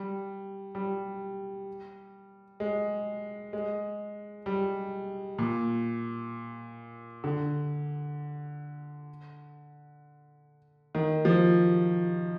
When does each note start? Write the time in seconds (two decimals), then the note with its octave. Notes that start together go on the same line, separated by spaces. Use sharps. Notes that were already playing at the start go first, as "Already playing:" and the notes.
Already playing: G3
0.75 G3
2.60 G#3
3.53 G#3
4.46 G3
5.38 A#2
7.24 D3
10.95 D#3
11.25 F3